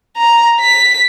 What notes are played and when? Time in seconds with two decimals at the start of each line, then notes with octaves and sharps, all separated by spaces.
0.17 A#5
0.61 B6